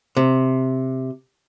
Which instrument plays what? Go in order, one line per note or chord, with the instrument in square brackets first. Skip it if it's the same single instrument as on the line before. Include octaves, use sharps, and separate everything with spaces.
[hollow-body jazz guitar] C3